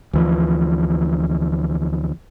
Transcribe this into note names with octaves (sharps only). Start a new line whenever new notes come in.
D2 E3 F3